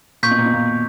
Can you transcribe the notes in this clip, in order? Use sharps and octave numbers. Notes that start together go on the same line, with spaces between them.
A#2 C#6 G6 B6
B2
A#2
B2
A#2